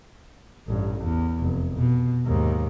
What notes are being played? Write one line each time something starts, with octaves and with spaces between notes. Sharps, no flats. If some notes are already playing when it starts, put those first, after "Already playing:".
A1 G2
E2
F1
B2
D#2 G#2